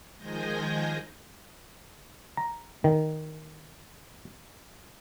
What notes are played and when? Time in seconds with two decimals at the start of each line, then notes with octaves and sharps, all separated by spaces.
0.17 D#3 F3 G#3 G#5 G6 A#6
2.37 A#5
2.84 D#3